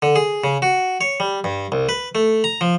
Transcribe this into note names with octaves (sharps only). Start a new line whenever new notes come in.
D3
G#4
C#3
F#4
C#5
G3
G2
C2
B4
A3
A#5
F3